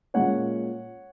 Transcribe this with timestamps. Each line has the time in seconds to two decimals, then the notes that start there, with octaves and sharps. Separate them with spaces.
0.14 A#2 G#3 C#4 C#5 F#5